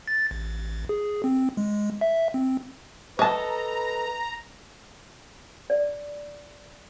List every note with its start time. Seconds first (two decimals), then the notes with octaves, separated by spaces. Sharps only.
0.08 A6
0.31 A1
0.89 G#4
1.24 C4
1.57 G#3
2.01 E5
2.34 C4
3.19 A4 B4 C#5 D#5 A5 A#5
5.70 D5